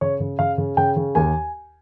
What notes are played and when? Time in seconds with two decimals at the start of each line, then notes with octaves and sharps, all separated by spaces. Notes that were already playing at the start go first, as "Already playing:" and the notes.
0.01 C#3 C#5
0.20 C#3
0.39 C#3 F5
0.58 C#3
0.77 C#3 G5
0.97 C#3
1.15 D#2 G#5